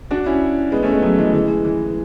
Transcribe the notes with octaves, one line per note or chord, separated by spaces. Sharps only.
D4 F#4
C#4 E4
G#3 B3
A3 C#4
G#3 B3
F#3 A3
E3 G#3
E3 G#3
E3